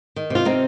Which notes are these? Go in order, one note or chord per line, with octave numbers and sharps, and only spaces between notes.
D#3
C3 F4
C3 C4 D#4